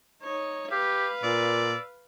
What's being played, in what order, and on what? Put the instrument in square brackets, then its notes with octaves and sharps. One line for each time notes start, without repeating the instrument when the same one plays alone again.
[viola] D#4 C#5
[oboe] G4 [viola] B4 F5
[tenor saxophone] A#2 [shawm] D5 [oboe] E6